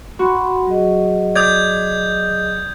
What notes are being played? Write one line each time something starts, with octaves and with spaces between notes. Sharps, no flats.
F#4 B5 C6
F#3 G#4 D#5
D5 D#6 G6 G#6